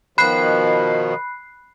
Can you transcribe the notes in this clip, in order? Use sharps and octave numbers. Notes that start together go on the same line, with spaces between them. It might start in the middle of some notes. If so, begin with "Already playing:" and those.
B2 D#3 F3 B5 F#6 C7